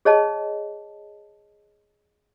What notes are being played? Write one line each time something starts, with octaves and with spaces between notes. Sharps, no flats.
G#4 C#5 D#5 A5